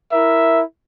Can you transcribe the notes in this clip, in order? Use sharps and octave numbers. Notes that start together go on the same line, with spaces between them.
E4 A#4 E5